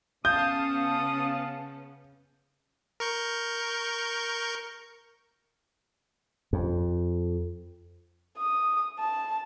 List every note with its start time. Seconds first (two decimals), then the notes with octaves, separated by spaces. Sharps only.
0.25 C#3 B3 C#4 F5 A5 D#6 G6
3.00 A#4 C#6 G6
6.53 F2
8.38 D#6
8.99 A5